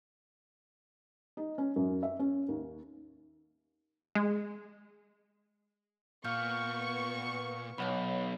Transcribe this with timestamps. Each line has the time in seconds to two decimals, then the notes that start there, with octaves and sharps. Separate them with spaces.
1.37 D#4
1.58 C#4
1.76 F#2
2.03 E5
2.19 C#4
2.48 D#2
4.15 G#3
6.25 A#2 B3 F5 C#6 F6 G6
7.78 B1 C#5 F#5 B5